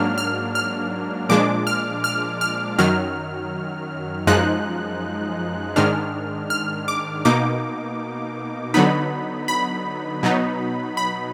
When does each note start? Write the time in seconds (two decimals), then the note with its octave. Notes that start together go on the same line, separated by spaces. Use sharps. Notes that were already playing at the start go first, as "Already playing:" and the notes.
Already playing: G#2 F#3 A#3 D4 F6
0.18 F6
0.55 F6
1.29 A#2 F3 G#3 D4 D6
1.67 F6
2.04 F6
2.41 F6
2.78 F#2 D#3 F#3 F6
4.27 F#2 F3 G#3 D#4 F#6
5.76 G#2 D#3 G#3 D4 F6
6.50 F6
6.88 D6
7.25 B2 A#3 D#4 D6
8.74 D3 F#3 B3 D#4 B5
9.48 B5
10.23 B2 F#3 B3 D#4
10.97 B5